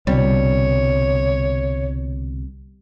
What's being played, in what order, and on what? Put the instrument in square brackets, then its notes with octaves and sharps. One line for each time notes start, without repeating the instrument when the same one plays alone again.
[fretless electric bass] C2 B2 D3 [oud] G3 [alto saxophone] C#5